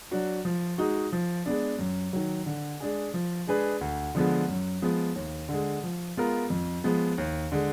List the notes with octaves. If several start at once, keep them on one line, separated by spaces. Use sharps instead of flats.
F#3 D4 F#4
F3
G#3 D#4 F#4
F3
G#3 B3 D4
F#2
D#3 F#3
D3
G#3 D4 G#4
F3
G#3 D4 G#4 B4
D2
D3 F3 G#3 B3
F#2
F3 G#3 B3
D#2
D3 G#3
F3
G#3 B3 F4 A#4
F2
F3 G#3 B3
D#2
D3 G#3